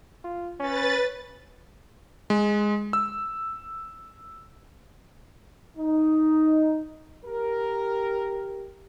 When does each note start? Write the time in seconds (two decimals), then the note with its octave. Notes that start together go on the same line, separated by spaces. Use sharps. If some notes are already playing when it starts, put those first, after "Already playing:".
0.24 F4
0.60 C#4 B4 A6
2.30 G#3
2.93 E6
5.78 D#4
7.25 G4 A#4